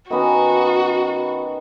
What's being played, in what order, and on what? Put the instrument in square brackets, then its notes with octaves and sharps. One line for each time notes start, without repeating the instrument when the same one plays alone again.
[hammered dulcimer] D#3 B3 C#4 [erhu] F#4